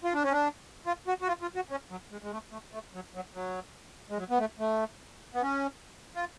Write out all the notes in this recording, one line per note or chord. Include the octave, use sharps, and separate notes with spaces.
F4
D4
C#4
D4
F4
F#4
F#4
F4
F4
F#4
C#4
F#3
G#3
G#3
A3
A3
A3
F#3
F#3
F#3
G#3
F#3
B3
A3
A3
B3
C#4
F4